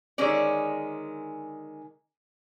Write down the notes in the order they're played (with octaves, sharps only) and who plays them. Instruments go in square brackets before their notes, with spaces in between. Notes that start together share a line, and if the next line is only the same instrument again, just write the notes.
[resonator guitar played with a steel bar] D3 D#3 G#3 C#4 D5